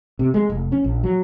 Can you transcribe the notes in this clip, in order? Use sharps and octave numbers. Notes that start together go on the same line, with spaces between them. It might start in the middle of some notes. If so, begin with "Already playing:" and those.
C3
G#3
F1
C#4
A#1
F#3